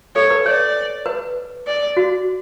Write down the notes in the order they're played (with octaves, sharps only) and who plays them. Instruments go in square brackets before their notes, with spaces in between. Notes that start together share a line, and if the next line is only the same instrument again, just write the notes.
[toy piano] A4 [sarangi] C#5
[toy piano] B4
[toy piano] C#5 [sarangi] D5
[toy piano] B4
[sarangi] D5
[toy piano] F#4